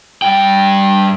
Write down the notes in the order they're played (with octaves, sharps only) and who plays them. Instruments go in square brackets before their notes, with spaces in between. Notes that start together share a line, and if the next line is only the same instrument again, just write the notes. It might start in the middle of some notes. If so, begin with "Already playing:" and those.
[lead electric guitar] G2 G5